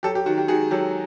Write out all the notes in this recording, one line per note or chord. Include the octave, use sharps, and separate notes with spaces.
F#3 G4 A4
G4
D#3 F#4
G4
D#3 F#4 G#4
F#3 G4 A4